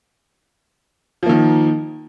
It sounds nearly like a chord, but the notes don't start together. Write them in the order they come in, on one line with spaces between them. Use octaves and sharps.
F3 A#3 D#3